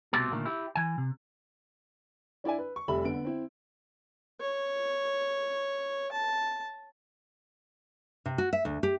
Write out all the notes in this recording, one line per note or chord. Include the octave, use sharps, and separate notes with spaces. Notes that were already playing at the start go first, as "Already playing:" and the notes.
C2 B2 A3 C4 G4 A4
A#2 D3 D#3 A3 A#3
E4 G4
E3 G#5
C3
D4 E4 D5 E5 G#5
B4
C#6
F1 G3 E5 B5 F#7
D3 B3 D7
C4 E4
C#5
A5
C3
F#4
E5
D2
G4